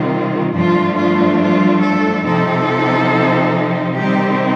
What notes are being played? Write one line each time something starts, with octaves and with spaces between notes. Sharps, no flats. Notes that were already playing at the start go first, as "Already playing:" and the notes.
Already playing: C3 D#3 G3 C4 F4
G2 F3 A3 D4 F4
F4
F4
A4
C3 F3 C4 D#4 A4
C3 D#3 G3 C4 D#4 G4